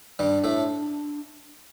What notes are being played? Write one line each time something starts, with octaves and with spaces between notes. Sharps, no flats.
G2 G3 D4
A2 A3